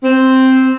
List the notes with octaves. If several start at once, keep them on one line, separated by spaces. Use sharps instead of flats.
C4